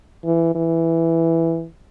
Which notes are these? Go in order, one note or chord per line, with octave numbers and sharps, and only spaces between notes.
E3
E3